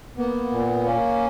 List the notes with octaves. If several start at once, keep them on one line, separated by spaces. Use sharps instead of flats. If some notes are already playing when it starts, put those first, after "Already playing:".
A#3 B3
A#2
A#3 C#4